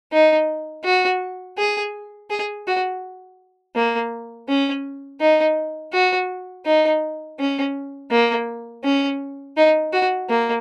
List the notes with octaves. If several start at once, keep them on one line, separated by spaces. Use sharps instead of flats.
D#4
F#4
G#4
G#4
F#4
A#3
C#4
D#4
F#4
D#4
C#4
A#3
C#4
D#4
F#4
A#3